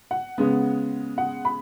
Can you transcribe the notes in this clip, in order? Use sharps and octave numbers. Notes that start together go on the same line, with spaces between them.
F#5
C#3 G#3 B3
F#5
B5